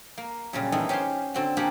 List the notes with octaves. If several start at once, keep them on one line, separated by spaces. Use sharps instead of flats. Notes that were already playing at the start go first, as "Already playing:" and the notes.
A#3
F#2 A#2 C#3 G3
D#3 E3 G#3 A3 B3 D#4
C#4 G4 G#4 C5 F5 C6
D3 C4 F#4
A#3 D4 G4 G#4 F#5